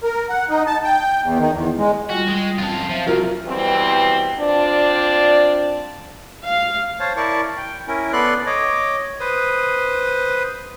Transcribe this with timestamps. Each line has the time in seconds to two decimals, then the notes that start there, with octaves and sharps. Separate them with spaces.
0.03 A#4
0.30 F#5
0.50 D#4
0.67 A5
0.84 G5
1.23 E2
1.39 D#3
1.52 E2
1.78 G#3
2.10 G3 F4 F#4 G5
2.28 G#3
2.58 F#2 C4 F4 A5
2.89 F3 E5 F5
3.07 C2 F#3 F4 A#4
3.46 B2 E3 G3 C4
4.39 C4 D4 F4 D5
6.46 F5
7.00 C5 C#5 F5 A5
7.16 E4 A#4 D5 A5 C#6
7.57 G5
7.87 C#4 E4 A#4
8.13 B3 A4 B4 D5 C6 F#6
8.46 C#5 D#5 D6
9.20 B4 C5 D#6